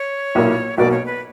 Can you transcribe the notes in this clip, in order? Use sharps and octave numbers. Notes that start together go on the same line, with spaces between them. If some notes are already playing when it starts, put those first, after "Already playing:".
Already playing: C#5
B1 A#2 A#3 E4
B1 B2 A#3 D5
C#5
B4